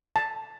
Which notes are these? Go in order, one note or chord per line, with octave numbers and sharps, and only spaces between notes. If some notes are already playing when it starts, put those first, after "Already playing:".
A5